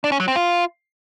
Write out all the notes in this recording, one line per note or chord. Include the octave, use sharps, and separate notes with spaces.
D4
C#4
F#3
C4
F4